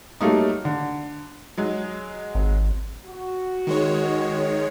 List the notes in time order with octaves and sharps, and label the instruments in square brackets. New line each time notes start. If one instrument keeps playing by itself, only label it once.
[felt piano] F#3 G3 A3 A#3 D#4
D3
[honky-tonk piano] F#3 G#3
[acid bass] G#1
[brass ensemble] F#4
[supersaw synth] D#3 G#3 C#5